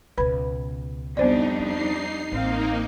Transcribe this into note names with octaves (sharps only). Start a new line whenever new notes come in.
C#2 B2 B4 B5
F2 G3 B3 D4 D#4 C5 D5
C#4 D#4 C7
A1 A#3 C4 D#4 F5